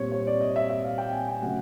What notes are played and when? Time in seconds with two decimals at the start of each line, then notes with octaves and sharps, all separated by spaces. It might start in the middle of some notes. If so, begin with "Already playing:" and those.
Already playing: A#2 G3 C4 C#5
0.12 C#5
0.27 D5
0.41 D#5
0.56 E5
0.70 E5
0.84 F5
0.98 G5
1.12 G#5
1.28 G5
1.42 C#3 F#3 A3 F#5